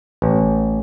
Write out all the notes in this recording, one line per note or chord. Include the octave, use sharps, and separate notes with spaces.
A1